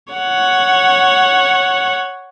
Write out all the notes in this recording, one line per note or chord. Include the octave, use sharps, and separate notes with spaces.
C#5 F#5